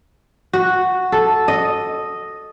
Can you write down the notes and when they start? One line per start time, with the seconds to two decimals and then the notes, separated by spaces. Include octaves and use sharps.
0.53 F#4
1.12 A4
1.48 D#5